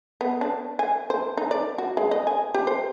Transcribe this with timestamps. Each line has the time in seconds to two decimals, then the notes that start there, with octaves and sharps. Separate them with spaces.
0.21 B3
0.41 D4
0.79 G#5
1.10 C5
1.37 D#4
1.51 D5
1.78 F#4
1.97 G#3
2.11 D#5
2.27 G#5
2.54 G4
2.67 C5